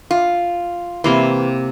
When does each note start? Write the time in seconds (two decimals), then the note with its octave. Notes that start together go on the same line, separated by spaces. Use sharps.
0.11 F4
1.04 C3 E3 A#3 C6